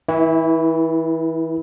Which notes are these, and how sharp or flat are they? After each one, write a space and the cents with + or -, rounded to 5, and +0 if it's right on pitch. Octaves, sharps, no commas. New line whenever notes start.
E3 -35 E4 +0